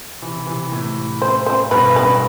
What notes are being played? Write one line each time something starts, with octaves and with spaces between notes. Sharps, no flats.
C3 E3
C3 E3
A2
C5
C5
G2 B2 B4
B4